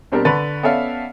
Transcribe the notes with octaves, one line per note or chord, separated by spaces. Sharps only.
B2 G3 C4 D4 G4 A#4
D3 B4 A5 C#6 A6
B3 C#4 A4 D5 E5 F5